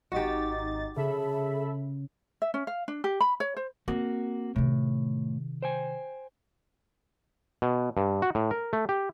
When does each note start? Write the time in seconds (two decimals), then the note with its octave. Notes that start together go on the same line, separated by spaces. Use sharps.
0.12 G#1 D#4 F#4 G4 A6
0.96 C#3 G#4 A4 E5 B5
2.42 E5
2.54 C#4
2.67 F5
2.88 D4
3.04 G4
3.21 B5
3.40 C#5
3.57 C5
3.88 A#3 C4 F#4
4.56 A2 C3 D#3
5.62 C5 G5 G#5
7.62 B2
7.97 G2
8.22 F#4
8.35 A2
8.51 A#4
8.73 A3
8.89 G4